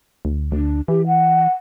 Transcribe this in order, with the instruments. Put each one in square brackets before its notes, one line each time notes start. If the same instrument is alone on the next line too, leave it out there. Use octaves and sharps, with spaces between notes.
[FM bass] D2
[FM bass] D2 [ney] D4
[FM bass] E3 [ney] G4
[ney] F#5